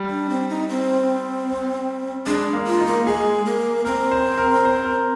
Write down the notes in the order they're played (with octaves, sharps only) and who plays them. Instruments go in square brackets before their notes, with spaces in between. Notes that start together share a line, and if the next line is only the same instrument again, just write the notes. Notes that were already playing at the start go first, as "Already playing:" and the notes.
Already playing: [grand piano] G3
[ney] D4
C4
D#4
C4
[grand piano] G#3 [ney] D4
[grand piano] A#3
[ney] F4
[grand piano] D#4
[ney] A#3
[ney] G#3 [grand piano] G#4
[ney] A#3
[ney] C4 [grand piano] A#4
[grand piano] C5
A#4
C5
A#4